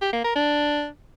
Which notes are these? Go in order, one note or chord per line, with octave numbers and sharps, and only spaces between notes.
G4
A#3
A#4
D4